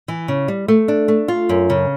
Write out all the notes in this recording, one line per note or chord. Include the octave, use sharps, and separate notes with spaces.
E3
C#3
G3
A3
D4
A3
F4
F#2
C#3